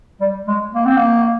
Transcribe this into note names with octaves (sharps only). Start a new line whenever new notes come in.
G3
G#3
A#3
C4
A#3